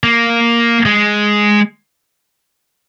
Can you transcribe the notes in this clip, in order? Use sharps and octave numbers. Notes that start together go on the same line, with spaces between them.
A#3
G#3